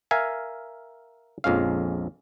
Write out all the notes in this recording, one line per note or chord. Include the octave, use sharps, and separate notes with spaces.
A#4 E5 F5 G#5
A#1 F2 G#3 C#4 F5